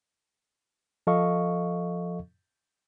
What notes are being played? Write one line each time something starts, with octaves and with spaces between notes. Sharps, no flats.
F3 A4 D#5 F5 C#6